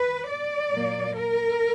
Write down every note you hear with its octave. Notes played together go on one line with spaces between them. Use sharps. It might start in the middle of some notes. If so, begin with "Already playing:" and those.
Already playing: B4
D5
A#2 F#3 A#3
A#4